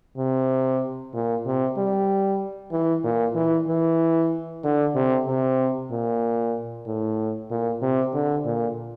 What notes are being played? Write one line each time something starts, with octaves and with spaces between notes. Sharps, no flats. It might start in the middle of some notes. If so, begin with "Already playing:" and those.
C3
A#2
C3
G3
E3
A#2
E3
E3
D3
C3
C3
A#2
A2
A#2
C3
D3
A#2